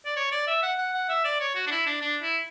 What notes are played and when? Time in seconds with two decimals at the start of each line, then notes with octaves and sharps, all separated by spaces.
0.05 D5
0.16 C#5
0.32 D5
0.47 E5
0.62 F#5
0.78 F#5
0.94 F#5
1.09 E5
1.24 D5
1.40 C#5
1.55 F#4
1.66 D4
1.71 E4
1.86 D4
2.01 D4
2.22 E4